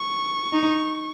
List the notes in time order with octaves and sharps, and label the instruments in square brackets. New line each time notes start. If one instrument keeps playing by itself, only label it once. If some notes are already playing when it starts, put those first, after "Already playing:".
Already playing: [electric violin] C#6
[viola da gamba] D#4